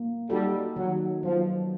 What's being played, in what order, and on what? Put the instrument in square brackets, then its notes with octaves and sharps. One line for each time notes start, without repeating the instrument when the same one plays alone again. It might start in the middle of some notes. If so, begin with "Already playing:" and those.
Already playing: [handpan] A#3
[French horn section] G3 [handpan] D#4 F#4 A4
[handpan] D#3 [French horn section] F#3
[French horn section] F3 [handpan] F#3 B3 D#4